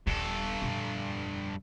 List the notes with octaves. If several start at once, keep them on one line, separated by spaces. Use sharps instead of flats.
D#1 A#1 G2 A4
F2 A#2